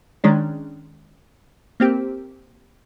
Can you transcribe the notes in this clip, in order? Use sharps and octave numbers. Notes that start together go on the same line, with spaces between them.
D#3 G#3 C#4 D4
A#3 C4 G4